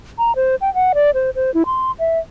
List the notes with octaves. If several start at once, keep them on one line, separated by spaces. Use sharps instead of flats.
A#5
C5
G5
F#5
D5
C5
C5
E4
C6
E5